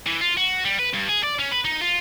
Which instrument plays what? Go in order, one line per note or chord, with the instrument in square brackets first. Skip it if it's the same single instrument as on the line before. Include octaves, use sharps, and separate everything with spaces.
[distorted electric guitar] E3
F4
F#4
G3
B4
G2
G#4
D5
C#4
B4
D#4
F4